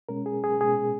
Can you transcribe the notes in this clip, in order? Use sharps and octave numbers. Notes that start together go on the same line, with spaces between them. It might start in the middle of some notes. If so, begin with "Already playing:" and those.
B2 G#3 C#4 A#4
G#4
G#4
B2 G#3 C#4 G#4